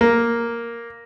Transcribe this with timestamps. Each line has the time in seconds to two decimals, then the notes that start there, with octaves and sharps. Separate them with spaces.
0.01 A#3